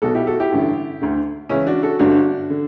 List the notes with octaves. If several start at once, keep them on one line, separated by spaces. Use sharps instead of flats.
B1 B2 F#4 A4
E4 G4
F#4 A4
E4 G4
A1 G2 D3
D2 D3
C#2 C#3 E3 C#4 E4
D4 F#4
F#4 A4
G1 G2 D3 D4 F#4
D3